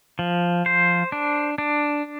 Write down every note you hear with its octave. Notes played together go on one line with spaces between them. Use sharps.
F3
C5
D4
D4